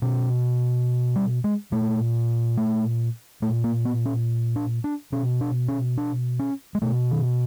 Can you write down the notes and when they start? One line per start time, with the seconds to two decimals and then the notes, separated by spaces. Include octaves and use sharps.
0.02 B2 C#4
1.16 G3
1.44 G#3
1.72 A#2 A3
2.57 A3
3.42 A#2 A3
3.64 A#3
3.85 B3
4.06 C#4
4.56 D4
4.84 D4
5.12 B2 C#4
5.41 D4
5.68 C#4
5.98 D4
6.39 C#4
6.75 G#3
6.82 B2 A3
7.11 D#3